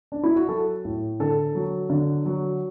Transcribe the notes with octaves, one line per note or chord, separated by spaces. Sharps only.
D4
E4
F#4
F#3 A4
A2
D3 A4
F#3
D3
F#3